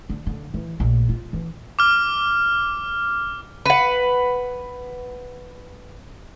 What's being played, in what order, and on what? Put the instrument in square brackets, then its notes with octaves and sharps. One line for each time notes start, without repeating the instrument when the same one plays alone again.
[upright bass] D3
D3
E3
A#1
F4
E3
[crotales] D6 F6
[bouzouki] B4 F#5